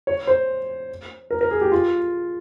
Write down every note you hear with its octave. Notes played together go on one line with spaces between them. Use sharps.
C#5
C5
A#4
A#4
G#4
G4
F4